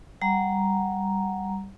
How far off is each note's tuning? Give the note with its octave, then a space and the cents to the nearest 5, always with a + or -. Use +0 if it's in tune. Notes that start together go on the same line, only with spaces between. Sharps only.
G3 +0 F#5 -5 A#5 +0